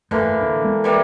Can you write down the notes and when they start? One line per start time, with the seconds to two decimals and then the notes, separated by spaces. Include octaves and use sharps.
0.11 G1 F2 D3 E3 A3 A#3
0.40 D1 D4
0.64 G#3 B3
0.84 E3 G3 A#3